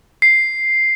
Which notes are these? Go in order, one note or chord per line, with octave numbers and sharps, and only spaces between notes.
C7